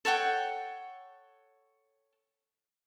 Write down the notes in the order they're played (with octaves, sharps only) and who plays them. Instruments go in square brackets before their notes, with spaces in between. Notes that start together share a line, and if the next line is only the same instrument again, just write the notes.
[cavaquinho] A4 C#5 F#5 G5